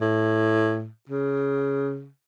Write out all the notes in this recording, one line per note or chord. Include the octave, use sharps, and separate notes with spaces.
A2
C#3